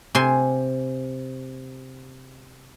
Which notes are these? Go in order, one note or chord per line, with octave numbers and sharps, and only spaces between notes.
C3 G#5 C6